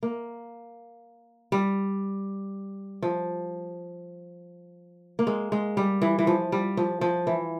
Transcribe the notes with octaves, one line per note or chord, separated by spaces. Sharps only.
A#3
G3
F3
A#3
G#3
G#3
G3
E3
E3
F3
G3
F3
F3
E3